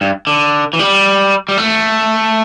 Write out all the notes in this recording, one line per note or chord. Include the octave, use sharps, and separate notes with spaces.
G2
D3
E3
G3
G3
A3